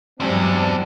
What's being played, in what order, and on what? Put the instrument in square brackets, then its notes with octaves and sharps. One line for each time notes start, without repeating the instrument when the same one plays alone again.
[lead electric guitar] E2 [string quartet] G2 C3 [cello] F#3 G#3 [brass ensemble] C4 D4